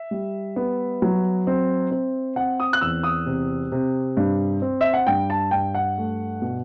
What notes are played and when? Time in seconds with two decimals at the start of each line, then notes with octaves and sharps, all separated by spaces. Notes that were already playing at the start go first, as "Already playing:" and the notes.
Already playing: E5
0.11 G3
0.56 B3
1.02 F#3
1.47 C4
1.91 C4
2.36 C4 F#5
2.60 D#6
2.73 F#6
2.81 E2 E6
3.03 D#6
3.26 C3
3.72 C3
4.17 G2
4.62 C4
4.81 E5
4.94 F#5
5.07 G2 G5
5.30 A5
5.51 G2 G5
5.74 F#5
5.97 A3
6.42 B2